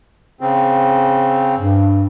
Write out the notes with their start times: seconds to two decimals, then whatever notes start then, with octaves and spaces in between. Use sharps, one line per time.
0.41 C#3 C4
1.57 G2